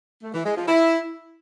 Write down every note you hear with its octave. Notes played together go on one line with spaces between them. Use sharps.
A3
E3
G#3
F3
E4